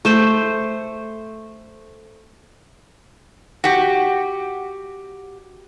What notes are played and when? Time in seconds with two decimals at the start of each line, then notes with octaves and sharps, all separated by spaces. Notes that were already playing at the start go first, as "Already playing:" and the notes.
0.05 A3 C5
3.64 F#4 G4